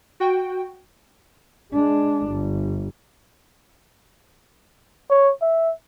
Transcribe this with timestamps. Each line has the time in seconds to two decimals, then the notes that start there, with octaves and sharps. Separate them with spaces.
0.20 F#4 G5
1.73 G#3 D4
2.26 G1
5.10 C#5
5.42 E5